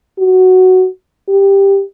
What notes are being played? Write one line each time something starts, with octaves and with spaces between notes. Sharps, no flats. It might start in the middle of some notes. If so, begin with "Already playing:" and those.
F#4
G4